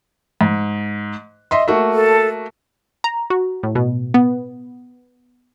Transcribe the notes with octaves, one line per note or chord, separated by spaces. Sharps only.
G#2
D#5 E5 C6
A3 A#3 F#4
A4
A#5
F#4
A2
B2
B3